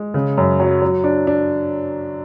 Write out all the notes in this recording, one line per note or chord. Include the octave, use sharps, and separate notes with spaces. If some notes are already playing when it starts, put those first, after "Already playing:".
Already playing: G#3
C#3
F#2
F#3
F#3
D4
D4